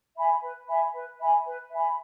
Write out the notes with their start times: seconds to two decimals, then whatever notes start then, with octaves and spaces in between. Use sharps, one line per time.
0.16 E5 G#5 B5
0.42 B4
0.68 E5 G#5 B5
0.93 B4
1.19 E5 G#5 B5
1.45 B4
1.71 E5 G#5 B5